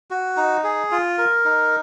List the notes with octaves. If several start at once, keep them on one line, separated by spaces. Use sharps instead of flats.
F#4
D#4
G#4
F4
A#4
D#4